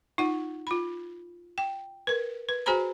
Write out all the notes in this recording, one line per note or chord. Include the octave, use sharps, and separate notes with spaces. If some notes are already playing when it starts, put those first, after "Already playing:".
D#4 F4 F#5
F4 B5
G5
A#4 B4
B4
F#4 G#4 C5 G#5 A#5 B5